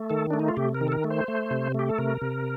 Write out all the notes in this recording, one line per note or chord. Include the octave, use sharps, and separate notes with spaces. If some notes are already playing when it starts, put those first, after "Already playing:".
Already playing: A3
D#3 A4
A3 D4
D#4
F4
C3 G4
A#4
D#3
A4
A#4
A3
C5
A3
C3
A3 G4
A4
C3 A#4
C3